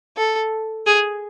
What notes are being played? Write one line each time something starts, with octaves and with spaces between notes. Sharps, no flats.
A4
G#4